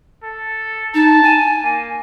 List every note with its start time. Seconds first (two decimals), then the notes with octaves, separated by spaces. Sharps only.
0.23 A4
0.94 D#4 A5
1.23 G#5
1.63 A#3